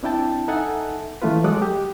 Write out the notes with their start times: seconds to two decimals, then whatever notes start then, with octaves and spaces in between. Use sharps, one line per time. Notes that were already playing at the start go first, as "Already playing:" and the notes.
0.03 C4 D4 E4 G5 A5
0.48 D#4 A4 E5 F#5 G#5 A5
1.22 E3 A3 C#4 F4 B4
1.44 F#3 G#3 A4 D6 D#6 F#6
1.62 G4